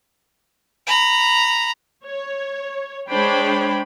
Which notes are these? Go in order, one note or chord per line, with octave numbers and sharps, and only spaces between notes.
A#5 B5
C#5
G#3 D4 C5 C#5 G5 B5